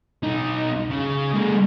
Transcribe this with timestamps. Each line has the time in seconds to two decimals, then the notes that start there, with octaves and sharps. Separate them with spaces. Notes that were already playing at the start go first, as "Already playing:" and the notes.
0.23 B1 D#4
0.90 C#3
1.34 G#3 A#3